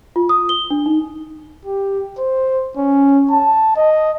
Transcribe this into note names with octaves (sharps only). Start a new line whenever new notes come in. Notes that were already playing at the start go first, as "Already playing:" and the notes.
F4
D#6
G7
D4
D#4
G4
C5
C#4
A5
D#5